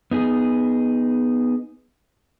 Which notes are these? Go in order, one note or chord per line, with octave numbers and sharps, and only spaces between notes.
B3 D#4 G#4